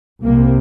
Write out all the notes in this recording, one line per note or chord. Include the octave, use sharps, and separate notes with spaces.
C2 C3 A#3